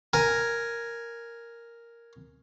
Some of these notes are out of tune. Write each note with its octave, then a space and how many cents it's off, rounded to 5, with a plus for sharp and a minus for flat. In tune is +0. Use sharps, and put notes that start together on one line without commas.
A#4 +0 G#5 +0